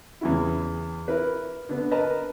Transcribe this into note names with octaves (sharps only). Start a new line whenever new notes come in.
E2 C#3 E4
E4 A#4 B4
D3 B3
A#4 B4 D#5 A5 A#5